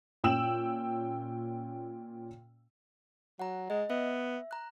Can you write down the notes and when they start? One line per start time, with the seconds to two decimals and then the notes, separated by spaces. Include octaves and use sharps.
0.24 A#2 C#4 G5 E6 E7 F#7
3.39 F#3 F#5 A#5
3.70 G#3 D#5
3.90 B3 E5
4.51 A#5 F#6